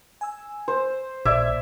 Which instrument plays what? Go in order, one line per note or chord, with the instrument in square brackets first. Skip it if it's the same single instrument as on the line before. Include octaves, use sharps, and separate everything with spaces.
[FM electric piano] G#5 E6
[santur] C5
[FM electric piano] A#1 A#2 G#6 [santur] D5 E5